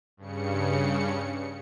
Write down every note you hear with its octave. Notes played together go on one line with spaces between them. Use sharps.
G2 C#3 C#7